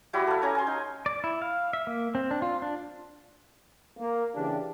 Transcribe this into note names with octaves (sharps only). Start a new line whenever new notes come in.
G3 E4 F#4 G4
A4 F5
C#4 G#5 A#5
G#5 C6
D#4
D5
E4
F5
E5
A#3
C4
D4
F4
D4
A#3
C#3 E3 D4 G4